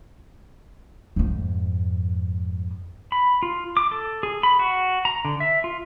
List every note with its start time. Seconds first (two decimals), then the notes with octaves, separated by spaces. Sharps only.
1.16 F2 G#2
3.12 B5
3.43 F4
3.77 D6
3.92 A4
4.23 G#4
4.43 B5
4.59 F#4
5.05 A#5
5.25 D3
5.40 E5
5.64 F4